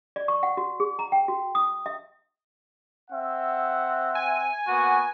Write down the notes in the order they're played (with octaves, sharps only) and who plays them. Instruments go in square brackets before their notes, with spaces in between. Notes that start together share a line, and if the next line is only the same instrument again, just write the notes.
[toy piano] D5
C#6
F#5
F#4
G#4
A#5
G5
F#4
D#6
E5
[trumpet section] C4 E5 F#5
[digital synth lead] G#5
[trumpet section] A#3 B3 F#4